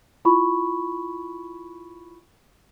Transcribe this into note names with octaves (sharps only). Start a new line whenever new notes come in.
E4 F4 B5 C#6